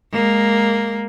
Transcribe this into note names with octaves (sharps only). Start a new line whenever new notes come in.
G#3 A#3